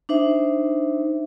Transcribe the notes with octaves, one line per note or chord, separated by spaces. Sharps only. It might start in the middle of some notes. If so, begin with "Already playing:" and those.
D4 D#4 C5 E5